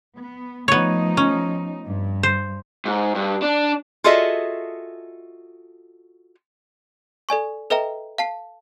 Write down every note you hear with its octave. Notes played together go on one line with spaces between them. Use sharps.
B3
F3 A3 B3 D#4 C#5
C#4
G2
C5
G#2
G2
D4
F4 F#4 G#4 A4 D#5 E5
A4 D5 G#5 C#6
A4 B4 D#5 E5 G5 A#5
F5 A5 C7